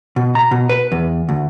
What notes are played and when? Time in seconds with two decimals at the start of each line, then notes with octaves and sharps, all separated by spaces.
0.16 B2
0.35 A#5
0.51 B2
0.69 B4
0.92 E2
1.29 D2